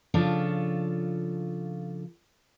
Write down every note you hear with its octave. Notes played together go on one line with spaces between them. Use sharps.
C#3 F3 D4 F4 A4 C#5